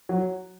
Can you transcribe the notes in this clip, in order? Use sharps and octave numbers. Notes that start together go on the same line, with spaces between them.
F#3